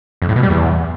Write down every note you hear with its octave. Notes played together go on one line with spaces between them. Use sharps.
F2
A2
B2
G3
E2